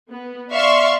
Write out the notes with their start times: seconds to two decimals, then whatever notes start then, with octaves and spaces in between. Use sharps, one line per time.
0.10 B3
0.51 D5 E5 F5 C6 C#6